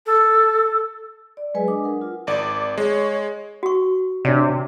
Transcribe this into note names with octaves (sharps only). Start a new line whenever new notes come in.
A4
D5
F#3 G#3 G#4 B4 D#5 G#5
D4 D6 D#6
A#4 F#5
F4
G#1 D5 D6
G#3 C#5
F#4 C#6
C3 D4 C#5 D5